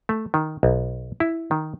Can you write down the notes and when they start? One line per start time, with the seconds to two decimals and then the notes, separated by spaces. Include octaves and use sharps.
0.09 A3
0.34 D#3
0.63 B1
1.20 E4
1.51 D#3